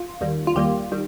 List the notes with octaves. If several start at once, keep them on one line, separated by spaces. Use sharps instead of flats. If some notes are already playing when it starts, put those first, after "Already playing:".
Already playing: F4
D#2 D#3 G3 A#3
F4
D#2 D#3 G3 A#3 G4
D#3 G3